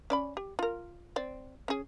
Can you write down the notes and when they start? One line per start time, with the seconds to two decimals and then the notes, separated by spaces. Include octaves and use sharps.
0.10 C#4 D5 B5
0.37 G4
0.59 F4 A#4
1.16 C4 D5
1.68 C#4 G#4